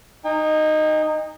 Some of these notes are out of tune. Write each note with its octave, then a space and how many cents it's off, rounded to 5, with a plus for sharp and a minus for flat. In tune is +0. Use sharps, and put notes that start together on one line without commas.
D#4 -10 G5 +45